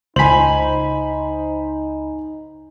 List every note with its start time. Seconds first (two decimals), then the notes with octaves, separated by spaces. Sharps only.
0.16 C#2 D#4 C5 G#5 B5 F#7